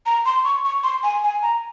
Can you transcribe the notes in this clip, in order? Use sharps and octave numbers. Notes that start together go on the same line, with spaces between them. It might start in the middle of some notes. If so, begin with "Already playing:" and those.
A#5
C6
C#6
C#6
C6
G#5
G#5
A#5